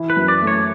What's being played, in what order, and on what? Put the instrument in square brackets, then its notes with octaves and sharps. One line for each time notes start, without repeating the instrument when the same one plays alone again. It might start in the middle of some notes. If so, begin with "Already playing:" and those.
Already playing: [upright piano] E3
[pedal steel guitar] B4
[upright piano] F#2
[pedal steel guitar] D5
[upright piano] A3
[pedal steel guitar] C#5